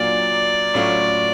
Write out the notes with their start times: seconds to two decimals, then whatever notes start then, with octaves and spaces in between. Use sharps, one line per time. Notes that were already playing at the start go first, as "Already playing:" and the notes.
Already playing: A#2 F#3 A#3 D4 F4 D5
0.74 A2 F#3 A3 C#4 F4